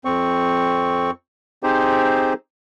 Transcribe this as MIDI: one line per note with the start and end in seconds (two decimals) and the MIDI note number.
0.05 1.11 41
0.05 1.11 60
0.05 1.11 85
1.63 2.33 60
1.63 2.33 63
1.63 2.33 67
1.63 2.33 68
1.63 2.33 72